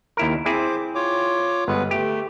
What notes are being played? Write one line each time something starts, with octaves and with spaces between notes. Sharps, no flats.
D#2 E4 A#4
C4 E4 G#4 C5 D6
F4 C#5 D6
G1 G#3 B3 B4
A3 G4